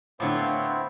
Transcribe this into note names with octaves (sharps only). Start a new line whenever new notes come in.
A2 D3 B3 C4 E4 F4 C5 C#5